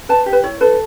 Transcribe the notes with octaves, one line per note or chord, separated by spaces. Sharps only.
B4 A5
G4
B4
E4 C#5
A4 B4